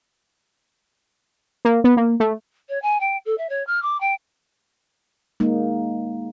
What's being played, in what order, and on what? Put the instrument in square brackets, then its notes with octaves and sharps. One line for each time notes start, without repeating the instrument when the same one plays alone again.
[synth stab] A#3
B3
A#3
A3
[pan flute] C#5
G#5
G5
A4
E5
C#5
F6
D6
G5
[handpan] G#3 A#3 D#4